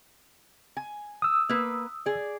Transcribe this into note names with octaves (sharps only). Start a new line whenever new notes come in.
G#5
D#6 E6
A#3 B4
G#4 D5